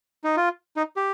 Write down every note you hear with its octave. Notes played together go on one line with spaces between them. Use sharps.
D#4
F4
D#4
G4